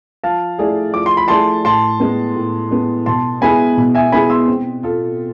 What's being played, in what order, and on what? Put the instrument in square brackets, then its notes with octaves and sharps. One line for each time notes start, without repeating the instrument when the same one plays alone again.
[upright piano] F3 [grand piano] F5 A5
[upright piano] A3 E4 G#4 D5
[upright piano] F3 [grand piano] D6
[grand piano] C6
B5
[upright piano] A3 E4 G#4 D5 [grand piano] A5 C6
[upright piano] A2 [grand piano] A5 C6
[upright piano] G#3 B3
A2
G#3 B3
[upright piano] B2 [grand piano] A5 C6
[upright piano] G#3 B3 E4 G#4 [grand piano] G#5 B5
[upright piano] B2
[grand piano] E5 G#5
[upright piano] G#3 B3 E4 G#4 [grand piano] G#5 B5
[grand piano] C6 E6
[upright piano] C4
F4 A4